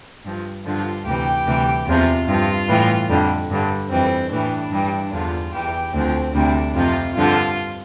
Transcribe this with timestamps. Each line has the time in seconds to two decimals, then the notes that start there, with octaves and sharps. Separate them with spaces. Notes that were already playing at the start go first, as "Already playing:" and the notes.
0.25 G2 F3
0.66 G2 D3 F3 F4
1.06 D2 C3 E3 G3 G4
1.47 D2 C3 E3 G3
1.88 E2 C3 F3 F4
2.28 G2 F3 F4
2.69 A2 E3 G3
3.10 F2 D3 G3
3.50 G2 D3 G3
3.90 F2 E3 G3 C4
4.31 A2 E3 G3 D4
4.72 G2 E3 G3
5.13 E2 D3 F3 F4
5.54 E2 E3 G3 G4
5.94 D2 D3 F3 C4
6.35 D2 C3 G3 D4
6.75 F2 C3 F3 F4
7.16 G2 D3 F3 F4